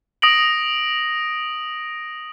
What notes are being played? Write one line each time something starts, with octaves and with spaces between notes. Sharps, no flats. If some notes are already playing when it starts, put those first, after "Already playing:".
D#6 A#6 D7 F#7